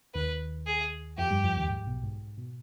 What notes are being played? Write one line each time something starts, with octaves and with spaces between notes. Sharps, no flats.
D#2 D#3 B4
G#4
F2 F3 G4
G2 G3
F2 F3
D#2 D#3
G#2
B1 B2
G#2
G#2
B2